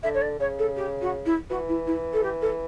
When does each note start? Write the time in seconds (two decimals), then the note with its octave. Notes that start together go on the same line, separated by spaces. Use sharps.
0.03 D3 E5
0.14 C#5
0.22 D5
0.40 C#3 C#5
0.59 A4
0.76 G4
1.01 F#4
1.26 E4
1.50 E3 F#4
1.68 E4
1.87 E4
2.13 A4
2.23 G4
2.42 A4